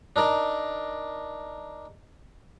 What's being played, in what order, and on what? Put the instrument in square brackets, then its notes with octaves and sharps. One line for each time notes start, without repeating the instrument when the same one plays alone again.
[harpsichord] D4 D#4 A#4 D5